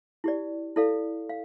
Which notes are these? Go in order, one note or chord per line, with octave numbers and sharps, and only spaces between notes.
E4 G4 D5
E4 A4 D5 F5
F5